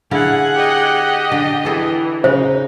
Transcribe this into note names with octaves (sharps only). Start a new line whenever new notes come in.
D3 E4 G#4 F5 F#5
G4 D#5
D3
E3 G#4 A4
C#3 D#4 C5